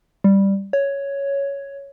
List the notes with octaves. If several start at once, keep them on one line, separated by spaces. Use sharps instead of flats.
G3
C#5